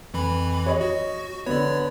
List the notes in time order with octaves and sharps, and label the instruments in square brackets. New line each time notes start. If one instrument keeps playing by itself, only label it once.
[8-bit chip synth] F2 E3 B5
[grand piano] C#5 D#5
[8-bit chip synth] F#4
[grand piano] D3 B3 [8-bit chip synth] C#5 D5